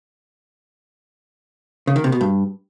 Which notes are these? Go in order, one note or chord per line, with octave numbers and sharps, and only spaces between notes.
C#3
D#3
C3
B2
G2